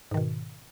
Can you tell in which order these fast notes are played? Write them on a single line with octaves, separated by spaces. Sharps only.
G#2 D#3 B2